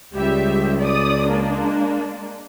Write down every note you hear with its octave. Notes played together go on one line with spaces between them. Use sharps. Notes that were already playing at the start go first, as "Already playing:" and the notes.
C#2 G3 G4 E5
D5 D#6
G#3 A#3 D4